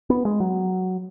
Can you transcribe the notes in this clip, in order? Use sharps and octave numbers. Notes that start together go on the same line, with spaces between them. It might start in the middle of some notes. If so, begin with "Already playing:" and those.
B3
G#3
F#3